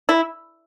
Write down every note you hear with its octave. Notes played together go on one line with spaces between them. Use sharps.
E4